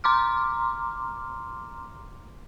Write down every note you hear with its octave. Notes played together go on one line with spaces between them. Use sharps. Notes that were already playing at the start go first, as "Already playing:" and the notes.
A#5 C6 D6 F6